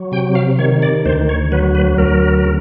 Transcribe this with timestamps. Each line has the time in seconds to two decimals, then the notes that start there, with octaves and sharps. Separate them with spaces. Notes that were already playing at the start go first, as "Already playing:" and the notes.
Already playing: F#3
0.12 C3 G5
0.35 F5
0.59 D#3 C#5
0.82 D5
1.05 D2 C5
1.29 C#5
1.52 F#3 B4
1.75 B4
1.98 D2 A#4
2.45 C#3